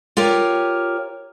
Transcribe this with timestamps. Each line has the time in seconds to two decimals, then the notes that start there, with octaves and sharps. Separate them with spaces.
0.17 F4 G4 A#4 C#5